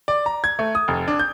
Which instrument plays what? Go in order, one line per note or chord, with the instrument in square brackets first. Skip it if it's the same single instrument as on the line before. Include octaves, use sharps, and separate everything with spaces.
[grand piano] D5
A#5
G#6
A3
D#6
F1
D4
G6